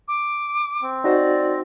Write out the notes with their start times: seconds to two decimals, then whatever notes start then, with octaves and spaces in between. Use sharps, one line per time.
0.08 D6
0.82 C4
1.04 D#4 F#4 C5 D5 A#6